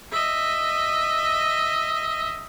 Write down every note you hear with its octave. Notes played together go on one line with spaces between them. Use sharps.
D#5 E5